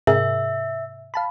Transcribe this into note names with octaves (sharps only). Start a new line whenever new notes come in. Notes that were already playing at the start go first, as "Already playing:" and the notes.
G#2 C3 G#4 A#4 E5
F5 A5 B5